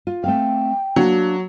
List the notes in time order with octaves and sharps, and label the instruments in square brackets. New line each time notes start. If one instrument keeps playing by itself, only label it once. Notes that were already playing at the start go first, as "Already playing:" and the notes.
[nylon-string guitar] F4
[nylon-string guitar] A3 C4 F5 [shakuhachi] G5
[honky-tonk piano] F#3 [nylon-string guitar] A#3 D4